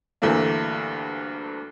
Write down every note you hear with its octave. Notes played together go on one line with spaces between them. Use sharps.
D2 G2 E3 A3 A#3